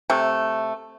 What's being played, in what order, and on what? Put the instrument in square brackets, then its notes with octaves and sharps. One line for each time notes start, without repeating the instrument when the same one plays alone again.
[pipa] C3 A3